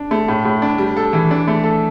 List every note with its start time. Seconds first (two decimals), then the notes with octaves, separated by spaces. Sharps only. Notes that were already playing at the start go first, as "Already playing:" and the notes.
Already playing: D4
0.11 A3
0.28 A2
0.45 A2
0.62 D4
0.78 G3
0.97 A4
1.13 E3
1.31 D4
1.47 A3
1.64 A4